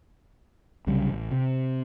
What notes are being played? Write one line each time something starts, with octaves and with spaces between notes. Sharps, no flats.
C2 C#3 F#3 G3
A1
C3